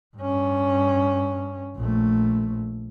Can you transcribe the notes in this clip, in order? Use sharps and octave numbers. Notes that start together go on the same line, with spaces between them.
G2 C#4
A#1 A3